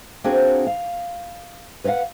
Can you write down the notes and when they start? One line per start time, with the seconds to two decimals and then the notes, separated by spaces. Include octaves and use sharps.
0.24 A#3 C4 D4 F#4 G#4 C5
0.67 F5
1.84 B4 C#5 D#5 F5 F#5